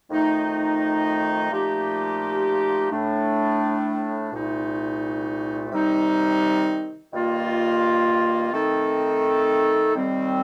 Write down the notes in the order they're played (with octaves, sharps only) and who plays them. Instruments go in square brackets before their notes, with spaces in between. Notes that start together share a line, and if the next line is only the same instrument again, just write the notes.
[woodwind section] F2 D#3 A3 D#4
A#2 F3 A3 D#4 G4
A2 A3 D4
C2 A#2 A3 D#4
C3 D#3 G3 C4 D#4
G2 D#3 A#3 F4
D#3 A3 C4 D#4 A4
D#2 D#3 G3 C4